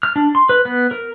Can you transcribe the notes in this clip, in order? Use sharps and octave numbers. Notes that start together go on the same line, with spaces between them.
F6
D4
C6
B4
B3
A#4